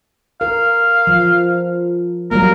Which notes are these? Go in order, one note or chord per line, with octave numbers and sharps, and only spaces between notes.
A#4 F5
F3
F#3 G3 A#3 A#4